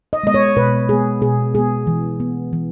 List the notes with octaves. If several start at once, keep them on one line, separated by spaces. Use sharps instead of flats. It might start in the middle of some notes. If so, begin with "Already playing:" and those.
D#5
G#3 B3 D#5
C#5
B2 B4
G#3 B3 G#4
B2 G#4
G#3 B3 G#4
E3
B3
E3